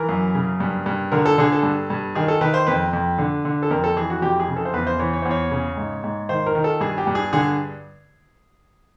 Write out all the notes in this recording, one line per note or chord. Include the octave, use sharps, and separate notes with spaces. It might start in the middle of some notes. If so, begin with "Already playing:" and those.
Already playing: E3 A#4
F#2
C#3
G2
G2
D3 A#4
A4
D3 G#4
A4
G2
G2
D#3 G#4
A4
D#3 B4
C5
F2 B4
F2
D3
D3
A4
F2 A#4
A4
E3 G#4
F#4
F2 G4
G#4
C#3
A4
C5
E2 B4
C5
E3 C#5
C#5
E2 C5
C#5
C#3
G#2
G#2
D#3 C5
A#4
D#3
A4
G2 G#4
G4
G2
G#4
D3 G#4